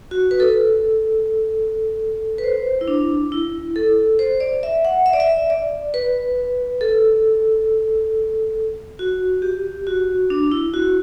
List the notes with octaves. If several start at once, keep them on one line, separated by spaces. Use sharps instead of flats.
F#4
B4
A4
B4
C5
E4
D4
E4
A4
C5
D5
E5
F#5
E5
D5
E5
D5
B4
A4
F#4
G4
F#4
D4
E4
F#4